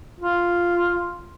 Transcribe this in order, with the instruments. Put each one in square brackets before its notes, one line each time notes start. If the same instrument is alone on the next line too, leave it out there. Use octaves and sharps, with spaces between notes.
[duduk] F4